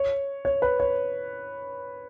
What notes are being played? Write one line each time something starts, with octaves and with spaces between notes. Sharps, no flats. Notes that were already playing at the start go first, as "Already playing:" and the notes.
Already playing: C#5
C#5
B4
C#5